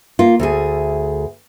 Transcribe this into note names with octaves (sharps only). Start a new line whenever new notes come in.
A#3 F4
D2 A3 G#4